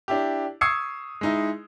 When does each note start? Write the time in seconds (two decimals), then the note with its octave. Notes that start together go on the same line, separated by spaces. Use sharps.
0.08 D4 E4 G4
0.61 C#6 D#6 E6 G#6 C7 C#7
1.21 G#3 D#4 E4